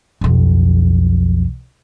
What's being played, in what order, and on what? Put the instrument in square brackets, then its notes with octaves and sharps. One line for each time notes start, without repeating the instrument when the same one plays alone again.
[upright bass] B1 F2